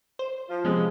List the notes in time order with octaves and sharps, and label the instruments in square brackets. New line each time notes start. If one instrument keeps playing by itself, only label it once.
[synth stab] C5
[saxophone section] F3 F4
[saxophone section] C3 G#3 [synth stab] F3 B3 C#4